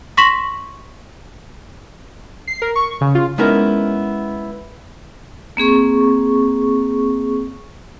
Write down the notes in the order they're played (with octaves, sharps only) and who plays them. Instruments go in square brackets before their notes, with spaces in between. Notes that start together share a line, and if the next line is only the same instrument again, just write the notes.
[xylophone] C6 C#6 A#6 B6 E7 F#7
[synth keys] C7
A#4
C#6
C#3
F4
[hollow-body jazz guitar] G#3 B3 C#4 D#4 E4 A#4
[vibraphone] A#3 C4 G#4 C#6